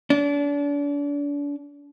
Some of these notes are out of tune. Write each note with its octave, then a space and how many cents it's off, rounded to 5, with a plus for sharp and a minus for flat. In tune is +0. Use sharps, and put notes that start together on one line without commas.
D4 -35